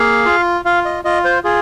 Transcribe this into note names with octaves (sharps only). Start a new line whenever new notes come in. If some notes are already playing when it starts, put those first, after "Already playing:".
Already playing: A#3 G#4 F5
F4
F4 F5
D#5
F4 D#5
C5
F4 G#4